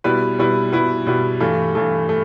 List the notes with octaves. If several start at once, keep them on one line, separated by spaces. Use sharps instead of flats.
B2 G3 E4 B4
B2 G3 E4 B4
B2 G3 E4 B4
B2 G3 E4 B4
G2 E3 A3
G2 E3 A3
A3